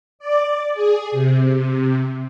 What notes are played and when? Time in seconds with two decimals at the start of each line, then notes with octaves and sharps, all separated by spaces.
0.19 D5
0.73 G#4
1.12 C3